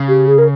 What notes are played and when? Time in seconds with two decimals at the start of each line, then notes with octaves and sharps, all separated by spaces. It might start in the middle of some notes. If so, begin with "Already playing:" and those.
Already playing: C#3
0.08 G4
0.27 G#4
0.38 A#4